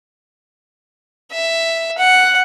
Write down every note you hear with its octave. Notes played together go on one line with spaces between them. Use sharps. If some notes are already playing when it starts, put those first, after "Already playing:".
E5
F#5